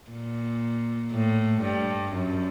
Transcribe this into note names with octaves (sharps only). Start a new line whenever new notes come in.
A#2
A2
G2
F#2